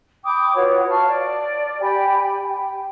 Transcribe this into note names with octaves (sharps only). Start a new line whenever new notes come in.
G5 B5 D6 D#6
F4 F#4 B4 C#5
F5 A5 C#6 F6
D5
G4 G5 G#5 B5
G5